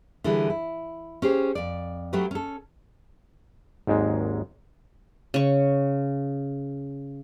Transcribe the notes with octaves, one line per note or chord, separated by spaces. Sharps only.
D3 E3 G3 E4 G#4
E4
C#4 G4 G#4 C5
F2 D5
F#3 A3 C#4 G4 B4
C#4 A4
G#1 D#2 G#2 G#3
C#3 C#6